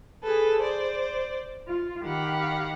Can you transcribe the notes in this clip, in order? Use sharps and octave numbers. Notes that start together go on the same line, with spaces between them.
G#4 A4 B4
C5 D5
F4
D#3 G4 F5 F#5 B5